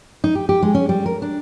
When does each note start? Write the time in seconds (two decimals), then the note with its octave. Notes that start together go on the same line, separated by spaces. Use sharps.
0.24 D#4
0.35 G4
0.49 G4
0.62 G#3
0.75 C#4
0.89 G3
1.06 A#4
1.22 D4